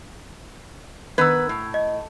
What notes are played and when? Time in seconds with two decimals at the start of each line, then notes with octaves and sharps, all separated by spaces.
1.18 D#3 B3 B4 E6 G#6
1.49 A2
1.74 D#5